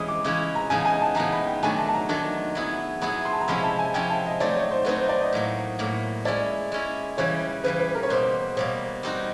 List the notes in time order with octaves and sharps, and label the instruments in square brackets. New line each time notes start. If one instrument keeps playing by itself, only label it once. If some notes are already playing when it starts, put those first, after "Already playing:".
Already playing: [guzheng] E3 G#3 B3 C#4 E4 [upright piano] D#6
[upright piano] D6
[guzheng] C#3 E3 G#3 C#4 E4
[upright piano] A#5
[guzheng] C#3 E3 G#3 B3 D#4 [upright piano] G#5
[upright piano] G#5
A5
[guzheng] C#3 E3 G#3 B3 D#4 [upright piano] A#5
[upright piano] B5
G5
[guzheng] D#3 F#3 A3 D4 [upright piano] G#5
[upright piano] A5
A5
A#5
[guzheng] D#3 F#3 A3 D4
F#3 B3 E4 G#4
[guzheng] F#3 B3 E4 G#4 [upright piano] B5
[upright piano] C6
A5
A#5
[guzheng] C3 F3 G#3 C#4 E4 [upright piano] B5
[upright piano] A5
G#5
[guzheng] C3 F3 G#3 C#4 E4 [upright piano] G5
[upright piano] A5
D#5
[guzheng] F#3 A3 C4 D#4 [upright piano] D5
[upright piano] C#5
C5
[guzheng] F#3 A3 C4 D#4 [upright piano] B4
[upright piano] C5
D5
D#5
[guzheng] A2 F#3 A#3
A2 F#3 A#3
[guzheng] G#3 C#4 E4 [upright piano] D5
[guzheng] G#3 C#4 E4
[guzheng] C#3 E3 G3 [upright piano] C#5
[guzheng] C#3 E3 G3 [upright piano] B4
[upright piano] B4
A#4
C#5
[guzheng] B2 G3 A#3 [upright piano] C5
[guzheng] B2 G3 A#3 [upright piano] C#5
[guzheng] G3 C4 D#4 F#4